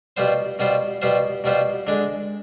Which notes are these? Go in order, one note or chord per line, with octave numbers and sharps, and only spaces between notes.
B2 G3 B3 F4 C5
B2 G3 B3 F4 C5
B2 G3 B3 F4 C5
B2 G3 B3 F4 C5
D3 G#3 D4